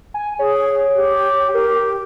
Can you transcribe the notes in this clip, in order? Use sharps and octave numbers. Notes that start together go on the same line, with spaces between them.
G#5
G#4 C#5
G4
G4 A#4